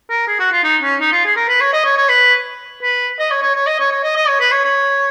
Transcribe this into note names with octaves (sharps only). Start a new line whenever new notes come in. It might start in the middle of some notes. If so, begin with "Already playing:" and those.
A#4
G#4
F#4
F4
D#4
C#4
D#4
F4
G#4
A#4
B4
C#5
D#5
C#5
C#5
B4
B4
D#5
C#5
C#5
C#5
D#5
C#5
C#5
D#5
D#5
C#5
B4
C#5
C#5